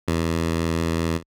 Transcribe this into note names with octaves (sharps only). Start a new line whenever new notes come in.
E2